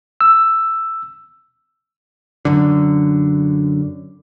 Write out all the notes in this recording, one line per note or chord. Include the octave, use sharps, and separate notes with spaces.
E6
F#2 D3